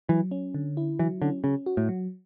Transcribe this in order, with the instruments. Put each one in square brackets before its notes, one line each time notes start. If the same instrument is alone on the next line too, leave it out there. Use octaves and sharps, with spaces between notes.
[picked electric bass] E3 [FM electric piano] F#3
[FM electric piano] C#4
D3
E4
[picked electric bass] E3 [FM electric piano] F#3
[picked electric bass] D3 [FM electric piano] C#4
[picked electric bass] C#3 [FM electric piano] C#4
[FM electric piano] F#4
[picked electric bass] A2
[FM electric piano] F#3